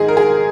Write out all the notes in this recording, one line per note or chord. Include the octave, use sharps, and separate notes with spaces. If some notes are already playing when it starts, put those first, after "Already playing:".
Already playing: G#2 D#3 G#3 G#4 D#5
A#4
G#4